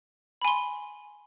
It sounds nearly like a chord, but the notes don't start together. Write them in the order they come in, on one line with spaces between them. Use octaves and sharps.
B5 G#5 C6